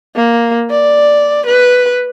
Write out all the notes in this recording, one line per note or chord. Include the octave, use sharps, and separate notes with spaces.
A#3
D5
B4